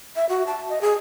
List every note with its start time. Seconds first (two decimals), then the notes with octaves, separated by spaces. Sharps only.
0.16 E5
0.29 F#4
0.47 A5
0.69 D#5
0.81 G#4